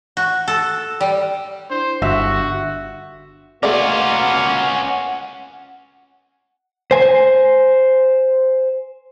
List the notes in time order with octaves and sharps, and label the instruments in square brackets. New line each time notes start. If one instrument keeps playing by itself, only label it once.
[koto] F#4
A4
G3
[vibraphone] D4 E4 [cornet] C5
[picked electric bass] G1 [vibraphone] D4 [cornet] F#4 [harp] E5
[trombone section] B2 A#3 [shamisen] A3 G#4 D5 [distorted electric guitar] C#4 F4 [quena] F#5
[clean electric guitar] C5 G#5